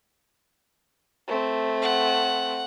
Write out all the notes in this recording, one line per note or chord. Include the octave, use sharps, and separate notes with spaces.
A3 C4
F#5